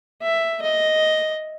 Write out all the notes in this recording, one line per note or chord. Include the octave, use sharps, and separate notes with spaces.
E5
D#5